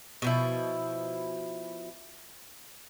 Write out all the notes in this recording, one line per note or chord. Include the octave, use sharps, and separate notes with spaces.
B2 F3 E4